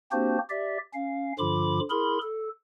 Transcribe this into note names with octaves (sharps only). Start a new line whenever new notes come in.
A#3 C4 D4 F#4 G4 C5
G4 D5 E5
C#4 F5
G2 D3 F3 F4 B5 D6
E4 G#4 A#4 B5 C6
A4